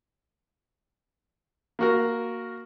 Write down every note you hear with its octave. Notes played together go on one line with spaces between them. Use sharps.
A#3 F#4 A#4